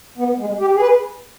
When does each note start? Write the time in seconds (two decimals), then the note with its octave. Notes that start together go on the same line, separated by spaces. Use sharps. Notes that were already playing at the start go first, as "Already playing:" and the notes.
0.18 B3
0.39 G#3
0.60 G4
0.75 G#4
0.81 B4